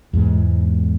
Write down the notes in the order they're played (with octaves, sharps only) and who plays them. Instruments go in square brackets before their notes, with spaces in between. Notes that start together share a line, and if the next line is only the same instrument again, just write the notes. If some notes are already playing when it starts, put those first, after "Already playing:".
[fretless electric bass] E2 G#2 G#3